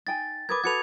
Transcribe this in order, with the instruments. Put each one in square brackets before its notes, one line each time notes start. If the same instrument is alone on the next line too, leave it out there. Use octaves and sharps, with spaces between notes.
[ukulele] D#4 G5 G#5 [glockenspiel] A6
[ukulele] A#4 B4 [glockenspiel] D6 D#6 G#6
[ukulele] F#4 A4 B4 [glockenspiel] G#6 C#7 F7